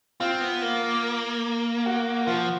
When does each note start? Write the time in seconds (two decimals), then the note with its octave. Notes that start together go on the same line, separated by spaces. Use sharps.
0.20 C4 F4
0.41 B3
0.62 A#3
1.86 F#4
2.27 F3 F4